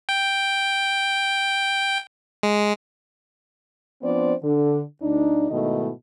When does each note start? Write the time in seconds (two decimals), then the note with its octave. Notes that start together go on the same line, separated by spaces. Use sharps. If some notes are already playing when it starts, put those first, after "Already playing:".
0.09 G5
2.43 G#3
4.02 F3 B3 C4 D4 C5 D5
4.43 D3
5.02 D2 D4 D#4
5.51 G#2 B2 D#3 A3 E4 D#5